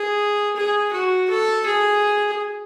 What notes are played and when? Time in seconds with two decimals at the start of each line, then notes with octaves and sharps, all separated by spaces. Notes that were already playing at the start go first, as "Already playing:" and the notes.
Already playing: G#4
0.56 G#4
0.93 F#4
1.30 A4
1.66 G#4